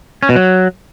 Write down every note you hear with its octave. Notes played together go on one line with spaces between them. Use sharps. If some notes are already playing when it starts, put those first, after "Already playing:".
C#4
B2
F#3